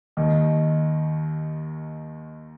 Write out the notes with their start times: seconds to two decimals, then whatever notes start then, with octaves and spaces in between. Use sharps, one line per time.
0.17 D#2 D#3